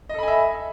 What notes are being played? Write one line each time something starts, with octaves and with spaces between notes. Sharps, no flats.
A4 D#5 E5 G#5 B5